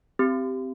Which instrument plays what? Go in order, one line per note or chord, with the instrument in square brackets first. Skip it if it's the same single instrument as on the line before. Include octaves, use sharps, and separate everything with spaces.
[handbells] C4 G4